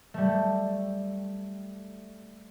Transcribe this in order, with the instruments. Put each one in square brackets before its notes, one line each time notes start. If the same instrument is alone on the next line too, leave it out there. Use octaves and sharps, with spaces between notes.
[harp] G3 A3